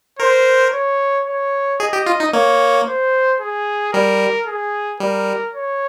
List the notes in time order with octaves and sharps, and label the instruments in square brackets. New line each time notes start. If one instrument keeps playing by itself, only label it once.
[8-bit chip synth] A#4 [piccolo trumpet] C5
[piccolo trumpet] C#5
C#5
[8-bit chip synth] G#4 [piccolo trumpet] D#5
[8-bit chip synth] G4
F4
D#4
[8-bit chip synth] A#3 [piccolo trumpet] C#5
[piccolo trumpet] C5
G#4
[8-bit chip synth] G3 [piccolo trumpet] A#4
[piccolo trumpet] G#4
[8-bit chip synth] G3 [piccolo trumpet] A#4
[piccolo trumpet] C#5